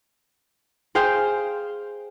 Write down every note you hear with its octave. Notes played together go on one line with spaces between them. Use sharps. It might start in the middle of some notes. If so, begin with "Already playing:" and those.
G#4 C5 F5 G5